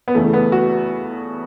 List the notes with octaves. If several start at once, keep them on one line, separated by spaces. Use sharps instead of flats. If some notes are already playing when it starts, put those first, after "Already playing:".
B3
E2 C#3 E3 A3
B3
F#4